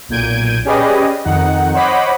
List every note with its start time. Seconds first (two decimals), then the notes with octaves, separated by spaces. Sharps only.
0.09 B1 A#2 G6 G#6 D7 D#7
0.65 C#4 G4 G#4 B4 D5 D#5
1.25 F2 D#3 D#4 F#5
1.74 C5 C#5 D#5 F#5 B5 D6